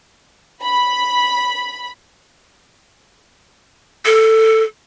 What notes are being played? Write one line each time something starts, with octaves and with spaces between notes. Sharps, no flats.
B5
A4